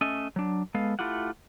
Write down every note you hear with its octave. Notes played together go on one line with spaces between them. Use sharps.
A3 C#4 D#5 E5
F#3 D4
G#3 B3 A4 F5
A3 E4 F4 G4 F#5